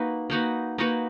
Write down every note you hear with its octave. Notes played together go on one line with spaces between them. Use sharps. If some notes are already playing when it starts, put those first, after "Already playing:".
Already playing: A#3 D#4 F#4 B4
A#3 D#4 F#4 B4
A#3 D#4 F#4 B4